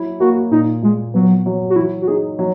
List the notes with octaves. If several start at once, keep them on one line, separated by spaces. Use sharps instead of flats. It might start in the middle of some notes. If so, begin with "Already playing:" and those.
Already playing: F#3 E4
A#3 F#4
A#2 D#4
A#2 G#3
F#3 B3
F#3
F#4
E3 E4
F#4
D#4 G#4
F#3